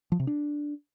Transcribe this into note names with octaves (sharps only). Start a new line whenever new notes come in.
F3
C3
D4